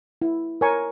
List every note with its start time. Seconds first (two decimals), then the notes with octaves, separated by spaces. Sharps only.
0.22 E4
0.61 A#4 C#5 G#5 C#6